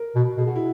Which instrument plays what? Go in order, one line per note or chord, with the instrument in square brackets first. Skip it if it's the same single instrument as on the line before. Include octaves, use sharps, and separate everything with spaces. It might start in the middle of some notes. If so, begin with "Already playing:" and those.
Already playing: [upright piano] A#4
[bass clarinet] B2
[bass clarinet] B2 [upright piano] G#4
[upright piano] F#4
E4